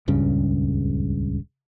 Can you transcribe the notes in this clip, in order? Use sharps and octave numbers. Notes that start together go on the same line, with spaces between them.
D#1 C#2 G2 C#3